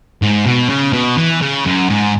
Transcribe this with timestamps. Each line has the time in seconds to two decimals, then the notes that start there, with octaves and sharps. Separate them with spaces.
0.22 G#2
0.46 B2
0.69 C#3
0.93 B2
1.17 E3
1.41 C#3
1.66 F#2
1.89 G#2